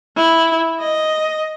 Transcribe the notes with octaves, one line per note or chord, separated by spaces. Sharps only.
E4
D#5